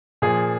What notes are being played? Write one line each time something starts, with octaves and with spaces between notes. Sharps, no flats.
A#2 F3 G#4